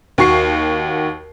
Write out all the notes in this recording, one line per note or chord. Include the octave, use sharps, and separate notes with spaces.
D#2 F#4 C#6 C7